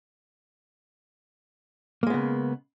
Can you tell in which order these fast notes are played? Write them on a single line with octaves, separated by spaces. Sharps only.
A#3 G#3 B3 C#3